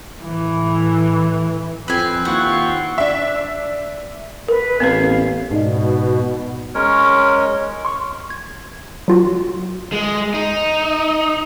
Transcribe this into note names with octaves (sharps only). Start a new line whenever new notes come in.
A2 E3
F2 C4 B4 G#5
D#2 E4 F4 F#5 C#6
D4 E5
A#4 B4
A1 B3 C4 B4 F5
G#2 B2 D#4 D5 D#5
G#3 C#4 A#4 C#5
C6 C#6
G#6
F#3 F4 F#4
G#3
D#4